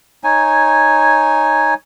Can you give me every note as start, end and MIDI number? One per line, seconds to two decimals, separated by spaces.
0.24 1.74 63
0.24 1.74 73
0.24 1.74 80